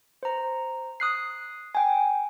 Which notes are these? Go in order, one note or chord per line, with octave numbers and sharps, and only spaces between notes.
C5 A#5
D#6 F#6 C7
G5 G#5